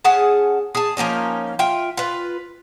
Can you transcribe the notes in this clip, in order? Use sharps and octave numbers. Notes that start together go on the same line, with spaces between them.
C#4 G#4 F#5 A5
G#4 A5
F3 A#3 C#4 D#4
F4 E5 G5
F4 B4